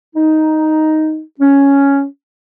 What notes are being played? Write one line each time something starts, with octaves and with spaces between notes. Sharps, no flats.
D#4
C#4